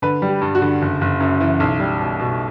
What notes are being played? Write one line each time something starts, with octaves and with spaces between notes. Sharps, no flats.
D3 B4
G3
G4
G2
F#4
D3
F#1
F#1
F#2
E3
B1
G3
B2
B2